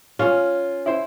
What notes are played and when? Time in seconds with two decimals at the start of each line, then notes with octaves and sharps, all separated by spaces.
0.19 C#4 F4
0.86 E4 C5